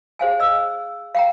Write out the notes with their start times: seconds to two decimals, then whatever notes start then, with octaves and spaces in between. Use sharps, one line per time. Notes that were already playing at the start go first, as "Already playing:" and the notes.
0.19 G#4 C5 F5 G#5
0.40 D#5 E6
1.15 F5 G5 A#5